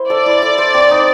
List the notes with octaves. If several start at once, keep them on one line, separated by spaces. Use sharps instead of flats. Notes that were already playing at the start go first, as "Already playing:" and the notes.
Already playing: E4 C5
A4 D5
E4
A4
C5
C4
D#4